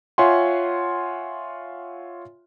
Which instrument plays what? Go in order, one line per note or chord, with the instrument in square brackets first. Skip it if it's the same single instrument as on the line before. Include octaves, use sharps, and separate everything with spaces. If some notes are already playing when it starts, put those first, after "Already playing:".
[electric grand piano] F4 C#5 E5 F#5 G#5 C6